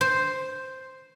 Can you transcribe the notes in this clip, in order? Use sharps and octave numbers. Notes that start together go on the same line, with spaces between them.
C5